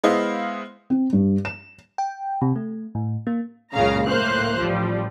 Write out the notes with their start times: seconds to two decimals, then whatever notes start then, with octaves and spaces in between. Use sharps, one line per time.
0.04 G#3 B3 E4 C5 D#5 F5
0.90 C4
1.13 G2
1.45 E7
1.98 G5
2.41 C3
2.56 A3
2.95 A2
3.27 A#3
3.73 C#2 F#2 A#2 C#3 F5 A#5
4.07 A2 A#3 C5 F5 F#6
4.58 A1 F3 G3